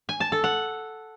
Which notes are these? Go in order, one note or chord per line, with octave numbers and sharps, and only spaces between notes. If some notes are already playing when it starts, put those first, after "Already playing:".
G#5
A5
A4
F#5